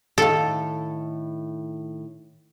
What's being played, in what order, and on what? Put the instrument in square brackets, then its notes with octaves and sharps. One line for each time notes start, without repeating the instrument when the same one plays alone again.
[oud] A2 D#3 F5 [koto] A4